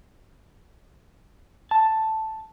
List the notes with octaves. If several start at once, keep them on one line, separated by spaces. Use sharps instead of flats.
A5